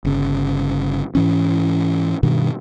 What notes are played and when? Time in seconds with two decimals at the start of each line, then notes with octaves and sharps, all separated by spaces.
0.05 G1 C#3
1.15 G#2 E3 C#4
2.23 G2 B2 D#3